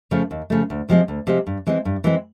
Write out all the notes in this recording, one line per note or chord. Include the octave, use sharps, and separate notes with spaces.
C#3 F3 A3
D#2
C#3 F3 A3
D2
C3 F3 G#3 C4
D2
C3 F3 G#3 C4
G2
E3 G#3 C4
G2
E3 G#3 C4